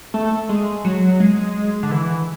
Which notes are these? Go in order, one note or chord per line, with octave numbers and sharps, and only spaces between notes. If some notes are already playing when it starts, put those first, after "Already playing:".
A3
G#3
F#3
G#3
D3
E3